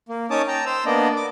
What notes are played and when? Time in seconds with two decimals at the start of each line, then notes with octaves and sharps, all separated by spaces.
0.09 A#3
0.30 C#4 D#4 C#5 A5 D6 D#6
0.48 G5 A5 A#5
0.66 C5 E6
0.86 A#3 B3 D4 D5 D#5
1.16 D6